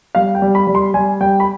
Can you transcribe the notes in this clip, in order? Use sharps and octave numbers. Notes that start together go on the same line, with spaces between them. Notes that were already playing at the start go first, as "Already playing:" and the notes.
G3 F5
G5
G3
B5
G3
C6
G3 G#5
G3 G5
B5